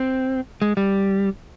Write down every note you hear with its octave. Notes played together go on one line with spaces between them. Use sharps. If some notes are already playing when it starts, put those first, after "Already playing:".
Already playing: C4
G#3
G3